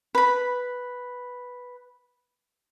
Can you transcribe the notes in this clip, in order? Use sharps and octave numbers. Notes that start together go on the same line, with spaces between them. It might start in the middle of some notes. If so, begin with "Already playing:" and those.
B4 B5